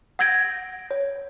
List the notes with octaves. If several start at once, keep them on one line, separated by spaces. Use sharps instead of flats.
F#5 E6 G6 G#6 A#6 D7
C#5